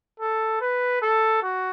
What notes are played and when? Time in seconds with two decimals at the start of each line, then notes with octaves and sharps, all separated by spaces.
0.20 A4
0.61 B4
1.02 A4
1.43 F#4